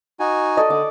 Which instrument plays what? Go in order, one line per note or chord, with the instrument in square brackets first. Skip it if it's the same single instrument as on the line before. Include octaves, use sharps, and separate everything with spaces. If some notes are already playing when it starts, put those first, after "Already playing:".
[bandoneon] D#4 F#4 G#5
[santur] A4 D5 D#5
[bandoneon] D3 [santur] D6